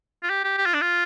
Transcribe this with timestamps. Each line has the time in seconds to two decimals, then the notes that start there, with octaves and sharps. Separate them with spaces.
0.23 F4
0.30 G4
0.44 G4
0.58 G4
0.66 F4
0.74 D4
0.81 F4